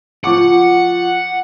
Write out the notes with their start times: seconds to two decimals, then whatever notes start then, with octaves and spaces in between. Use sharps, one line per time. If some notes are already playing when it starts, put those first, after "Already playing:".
0.24 F3 F#5 C#6 D6